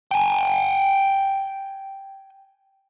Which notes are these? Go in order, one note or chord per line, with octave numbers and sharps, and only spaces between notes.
G5 G#5